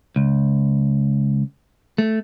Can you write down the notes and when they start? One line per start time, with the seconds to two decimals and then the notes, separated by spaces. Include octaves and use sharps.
0.16 C#2
1.98 A3